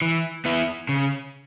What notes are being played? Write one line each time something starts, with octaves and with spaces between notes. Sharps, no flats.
E3
B3 E4
C#3